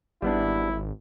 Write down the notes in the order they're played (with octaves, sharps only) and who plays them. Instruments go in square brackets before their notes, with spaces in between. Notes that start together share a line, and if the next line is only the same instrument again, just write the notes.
[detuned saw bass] G#1 [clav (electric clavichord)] G3 B3 D4 [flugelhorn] E4